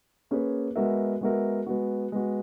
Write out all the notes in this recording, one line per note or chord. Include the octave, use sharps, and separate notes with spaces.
A#3 C#4 G#4 B4
G#3 B3 F#4 A#4 E5
G#3 B3 F#4 A#4 E5
G#3 B3 F#4
G#3 B3 F#4